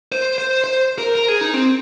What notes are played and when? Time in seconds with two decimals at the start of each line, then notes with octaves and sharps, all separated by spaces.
0.12 C5
0.38 C5
0.64 C5
0.98 A#4
1.15 A#4
1.28 G#4
1.41 D#4
1.54 C4